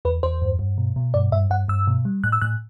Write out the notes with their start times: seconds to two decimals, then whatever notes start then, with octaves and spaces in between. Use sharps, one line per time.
0.05 E2 B4
0.23 E2 C5
0.42 G2
0.59 G2
0.78 B2
0.96 B2
1.14 G2 D5
1.32 G2 E5
1.50 G2 F#5
1.68 G2 E6
1.87 B2
2.05 G3
2.24 A2 F#6
2.32 E6
2.42 A2 F#6